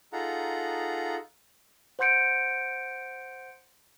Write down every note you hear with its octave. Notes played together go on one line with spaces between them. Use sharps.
D#4 F4 G#4 A4 F#5 A#5
C5 F#5 C6 G6 C#7 D7